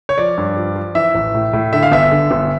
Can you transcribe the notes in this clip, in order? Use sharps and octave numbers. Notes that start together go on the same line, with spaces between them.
C#5
F3 D5
G2
F3
F3
E3 E5
A1
A2
A2
D3 E5
F5
G1 E5
D3
G1